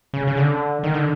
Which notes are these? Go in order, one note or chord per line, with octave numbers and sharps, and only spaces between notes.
C#3
C#3
D3
D#3
D3